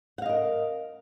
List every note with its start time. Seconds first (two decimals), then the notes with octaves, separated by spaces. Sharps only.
0.18 F#5
0.22 F5
0.26 D#5
0.29 A#4